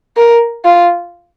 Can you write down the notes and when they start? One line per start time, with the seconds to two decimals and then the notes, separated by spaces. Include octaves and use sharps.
0.17 A#4
0.65 F4